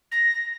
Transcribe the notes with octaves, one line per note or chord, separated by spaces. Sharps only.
A#6